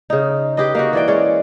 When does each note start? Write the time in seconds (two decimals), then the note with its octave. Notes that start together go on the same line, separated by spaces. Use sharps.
0.10 C#3 D#4
0.57 G4 G#4 B4 D#5
0.75 A#3 D#4 F#4
0.93 E3 D5 G5
1.08 G#3 C#4 C#5 D5